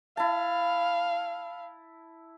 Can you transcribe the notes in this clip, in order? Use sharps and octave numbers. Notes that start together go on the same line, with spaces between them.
E4 F5 A5